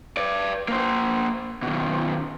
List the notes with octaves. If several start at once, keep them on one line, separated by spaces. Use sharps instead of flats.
B4 D5
A#3 C5
B2 D#3